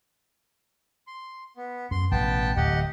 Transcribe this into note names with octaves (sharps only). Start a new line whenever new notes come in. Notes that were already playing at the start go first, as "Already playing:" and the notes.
C6
B3
F#2 C6
A1 B2 B3 G5 A5
D1 A2 G4 D#5 F#5